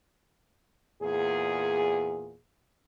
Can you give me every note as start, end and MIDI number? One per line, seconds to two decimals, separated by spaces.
1.03 2.37 40
1.03 2.37 46
1.03 2.37 68